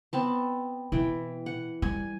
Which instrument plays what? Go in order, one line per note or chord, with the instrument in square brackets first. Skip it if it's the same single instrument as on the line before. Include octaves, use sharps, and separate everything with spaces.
[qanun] B3 C4 A5
[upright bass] B2 [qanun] E3 G5
[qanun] F#5
[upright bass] G3 [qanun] G#5